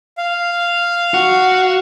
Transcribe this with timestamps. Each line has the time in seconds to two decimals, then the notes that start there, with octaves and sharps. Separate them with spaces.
0.18 F5
1.14 F#4